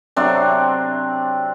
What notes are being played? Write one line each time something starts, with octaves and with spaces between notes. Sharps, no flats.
C3 F#3 C4 D4